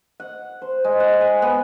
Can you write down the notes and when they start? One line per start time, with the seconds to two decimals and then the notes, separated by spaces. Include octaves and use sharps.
0.20 F#5
0.62 C5
0.84 G#3
1.00 F#5
1.21 G#5
1.42 B3